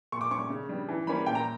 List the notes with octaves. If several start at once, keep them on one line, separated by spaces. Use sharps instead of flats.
A#2 C#6
D6
G3 C#4 C#6
C#3
G3 B3 D4
E3
G3 A#3 C#4 B5
A#2 G5
A#5